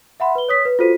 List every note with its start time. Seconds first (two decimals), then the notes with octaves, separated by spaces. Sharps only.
0.20 E5 F#5 B5 C6
0.35 B4 G7
0.49 C#5 D#6 B6
0.65 B4
0.79 F4 F#4 A4 C5 B6 D#7